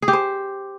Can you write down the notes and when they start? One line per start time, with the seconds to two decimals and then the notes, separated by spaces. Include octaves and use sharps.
0.02 G#4
0.08 G4
0.13 C5